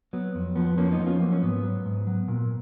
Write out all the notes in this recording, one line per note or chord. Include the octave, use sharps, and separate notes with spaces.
F#3 B3
F2
F3 B3
F3 A#3 C#4
B3 D#4
F3
C#4 F4
F#3 A#3
C#4
G#2 B3
F#3
G#2
F#3
A#2